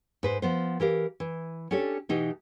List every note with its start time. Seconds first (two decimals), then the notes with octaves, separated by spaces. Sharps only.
0.23 G#2 B4 C5
0.42 F3 B3 C5
0.80 E3 G4 A#4 F5
1.20 E3
1.71 C#4 D4 G4 A4 C#5
2.09 B2 E3 D#4 G4